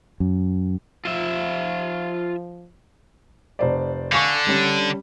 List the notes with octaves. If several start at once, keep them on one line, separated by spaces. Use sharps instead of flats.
F#2
F3 F4 E5
F1 C5 D5
D3 F5 G#5 C#6
G3 C#4